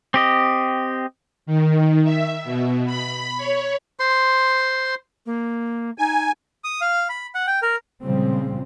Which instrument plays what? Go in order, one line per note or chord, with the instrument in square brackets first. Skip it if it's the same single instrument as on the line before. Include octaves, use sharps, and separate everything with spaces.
[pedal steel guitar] C4 G4 D#5
[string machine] D#3
E5
B2
B5
C#5
[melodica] C5 C6
[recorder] A#3
[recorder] D#4 [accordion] G#5
[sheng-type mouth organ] D#6
F5
B5
F#5
G5
A#4
[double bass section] A#2 C#3 F3 G3 G#3 C4